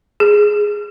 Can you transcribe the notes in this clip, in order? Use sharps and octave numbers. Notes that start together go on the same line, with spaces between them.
G#4